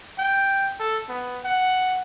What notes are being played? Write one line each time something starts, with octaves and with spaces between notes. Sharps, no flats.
G5
A4
B3
F#5